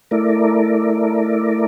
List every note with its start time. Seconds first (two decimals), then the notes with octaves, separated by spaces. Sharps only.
0.11 A3 E4 A#4 D5